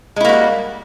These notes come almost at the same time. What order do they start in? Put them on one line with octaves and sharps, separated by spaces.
G#3 E4 A#3 F#4 G3